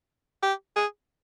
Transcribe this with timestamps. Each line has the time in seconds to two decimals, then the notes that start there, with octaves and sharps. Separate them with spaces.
0.43 G4
0.76 G#4